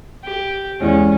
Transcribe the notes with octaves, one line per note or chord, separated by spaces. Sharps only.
G4
E2 G#3 C#4